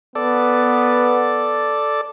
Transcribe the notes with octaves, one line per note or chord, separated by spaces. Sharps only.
B3 A4 D5